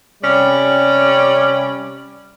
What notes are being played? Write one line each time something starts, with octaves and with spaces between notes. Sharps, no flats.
C3 G3 C#4 D5 B5